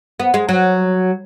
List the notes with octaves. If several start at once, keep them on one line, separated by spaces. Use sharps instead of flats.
B3
G#3
F#3